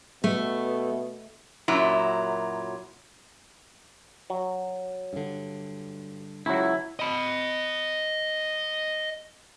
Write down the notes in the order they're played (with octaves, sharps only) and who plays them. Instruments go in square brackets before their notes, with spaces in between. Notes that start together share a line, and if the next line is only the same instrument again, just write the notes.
[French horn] B2 [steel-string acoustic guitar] A3
[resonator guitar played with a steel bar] F#2 A#2 F#3 E4
[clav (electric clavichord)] F#3
[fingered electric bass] G2 D3
[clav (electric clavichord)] C#2 F#3 [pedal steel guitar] E4
[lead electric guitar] D#5 B5